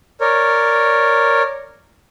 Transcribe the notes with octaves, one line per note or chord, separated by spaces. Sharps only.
A#4 C#5 D5